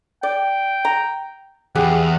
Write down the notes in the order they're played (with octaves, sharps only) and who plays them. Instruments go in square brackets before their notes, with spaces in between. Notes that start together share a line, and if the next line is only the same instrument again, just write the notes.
[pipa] D5 [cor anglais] G5
[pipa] A#5
[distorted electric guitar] E2 [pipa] G4 G#4 [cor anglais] F#5